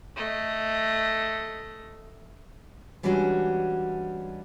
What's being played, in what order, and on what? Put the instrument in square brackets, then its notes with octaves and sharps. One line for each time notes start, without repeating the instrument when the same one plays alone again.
[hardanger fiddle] A3 D#5
[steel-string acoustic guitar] E3 G3 G#3 C#4 D4 F#4